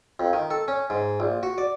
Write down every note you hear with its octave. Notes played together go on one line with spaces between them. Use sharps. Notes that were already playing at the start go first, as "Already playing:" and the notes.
F2
D#3
A4
C#4
G#2
A#1
F#4
D5